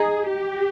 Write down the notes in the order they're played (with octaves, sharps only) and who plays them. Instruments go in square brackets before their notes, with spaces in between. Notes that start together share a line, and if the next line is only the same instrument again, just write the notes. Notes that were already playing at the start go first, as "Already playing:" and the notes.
Already playing: [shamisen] D#4 [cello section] G#4
[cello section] G4